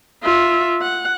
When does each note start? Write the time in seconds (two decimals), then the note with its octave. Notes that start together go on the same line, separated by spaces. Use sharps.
0.23 F4 E5
0.82 F#5